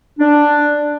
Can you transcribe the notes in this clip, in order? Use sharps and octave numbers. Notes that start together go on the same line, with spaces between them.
D4